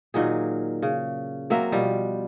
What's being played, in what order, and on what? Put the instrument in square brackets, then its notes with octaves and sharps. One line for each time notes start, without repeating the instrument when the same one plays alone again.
[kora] A#2 D#3 F#3 G#4
C#3
F#3 A#3 C4 E5
B2 F3 G3